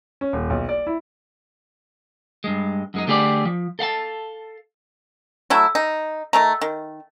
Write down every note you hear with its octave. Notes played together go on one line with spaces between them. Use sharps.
C#4
D#1
B1
D5
E4
G2 G#3
F#2 G#3 D#4
D3 A3 G4 G#4 B4 D5
F3
A4 F5 F#5 A5
F#3 A3 E4
D#4
D#3 A3 A#5
D#3